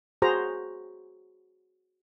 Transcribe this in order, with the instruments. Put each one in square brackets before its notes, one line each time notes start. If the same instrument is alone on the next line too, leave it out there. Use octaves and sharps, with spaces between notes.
[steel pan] F#4 G#4 C5 A#5